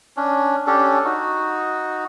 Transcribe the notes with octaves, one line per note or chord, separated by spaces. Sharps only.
C#4 D4
C#4 D4 G4 A4
D#4 F#4